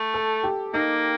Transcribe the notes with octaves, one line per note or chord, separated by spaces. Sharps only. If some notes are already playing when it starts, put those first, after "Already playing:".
Already playing: A3
A4
G4
A#3 D#4